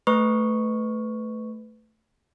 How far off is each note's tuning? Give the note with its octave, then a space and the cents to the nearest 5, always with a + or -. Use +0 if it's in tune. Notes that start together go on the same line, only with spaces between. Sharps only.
A3 +0 B4 +15 C#6 +0